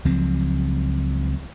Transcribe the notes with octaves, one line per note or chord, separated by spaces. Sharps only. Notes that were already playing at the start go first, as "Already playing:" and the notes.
C#2 F3 F#3 C4